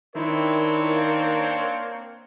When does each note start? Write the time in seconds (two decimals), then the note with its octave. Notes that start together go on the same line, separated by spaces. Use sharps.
0.16 D#3 C4 D4 E4 A#4 C#5
0.92 A#3